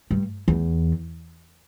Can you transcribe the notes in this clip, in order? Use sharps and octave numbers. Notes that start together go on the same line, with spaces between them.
G2
E2